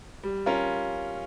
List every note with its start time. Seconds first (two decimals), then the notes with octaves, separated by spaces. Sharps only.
0.23 G3
0.46 C#4 F4 A#4